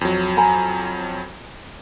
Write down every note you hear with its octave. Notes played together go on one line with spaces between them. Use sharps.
F2 F#3
G#5 A#5 B5